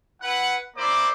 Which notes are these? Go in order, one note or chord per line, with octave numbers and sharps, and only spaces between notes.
E4 B4 F#5
A#3 E4 C5 D5 D6